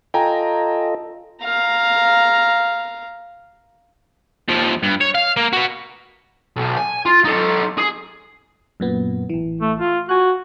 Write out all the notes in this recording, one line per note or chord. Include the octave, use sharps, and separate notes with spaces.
F4 A4 D#5 G5 G#5 A#5
F5 A#5
D#2 F3
G2
C#5
F5
A#3
F#4 B4
B1
G#5
F4
D#4 A4
G#4
F#2 A#2 B3
A1 E3
A3
F4
F#4 G#5 F#6